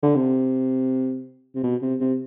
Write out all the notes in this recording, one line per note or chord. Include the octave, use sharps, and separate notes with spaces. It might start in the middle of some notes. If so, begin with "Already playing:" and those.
D3
C3
C3
B2
C3
C3